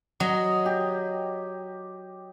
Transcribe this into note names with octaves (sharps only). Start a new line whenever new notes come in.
F#3 D#5
G4